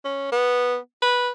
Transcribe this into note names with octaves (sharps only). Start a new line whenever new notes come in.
C#4
B3
B4